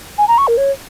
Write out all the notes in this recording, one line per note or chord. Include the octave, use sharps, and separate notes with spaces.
G#5
A#5
C#6
A#4
C#5